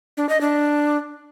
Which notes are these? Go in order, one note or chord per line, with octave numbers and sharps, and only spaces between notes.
D4
D#5
D4